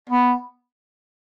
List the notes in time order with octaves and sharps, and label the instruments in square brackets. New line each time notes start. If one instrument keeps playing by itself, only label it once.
[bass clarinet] B3